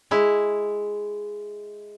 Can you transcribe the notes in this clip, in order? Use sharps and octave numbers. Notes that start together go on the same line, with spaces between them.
G#3 E4